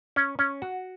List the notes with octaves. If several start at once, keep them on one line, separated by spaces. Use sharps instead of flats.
C#4
C#4
F#4